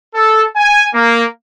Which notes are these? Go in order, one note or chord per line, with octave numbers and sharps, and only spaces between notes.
A4
G#5
A#3